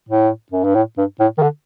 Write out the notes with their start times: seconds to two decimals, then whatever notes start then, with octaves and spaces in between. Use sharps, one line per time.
0.09 A2
0.52 F#2
0.64 G2
0.75 A2
0.97 G2
1.20 A2
1.38 D#3
1.42 D3